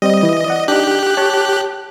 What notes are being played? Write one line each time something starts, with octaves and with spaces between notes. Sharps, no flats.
G3 C4 D#5
E3
D5 F#5
D4 D#4 G4 F#6
C#5 A5